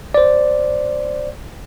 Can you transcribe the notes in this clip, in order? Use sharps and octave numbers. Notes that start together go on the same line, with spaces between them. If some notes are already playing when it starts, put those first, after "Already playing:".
C5 D5